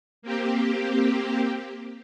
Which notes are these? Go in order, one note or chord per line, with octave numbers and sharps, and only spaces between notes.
A#3 C4 G4